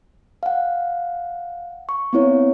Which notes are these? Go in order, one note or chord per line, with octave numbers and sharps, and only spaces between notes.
F5 F#5
C#6
B3 C4 E4 C#5